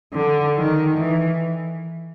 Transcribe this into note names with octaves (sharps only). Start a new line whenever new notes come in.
D3
D#3
E3